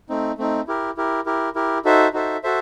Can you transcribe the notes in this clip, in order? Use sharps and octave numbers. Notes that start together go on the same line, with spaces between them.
A3 C4 D#4
A3 C4 D#4
E4 G4 A#4
E4 G4 A#4
E4 G4 A#4
E4 G4 A#4
D#4 F#4 A4 C5 E5
D#4 F#4 A4 C5 E5
F#4 A4 C5 E5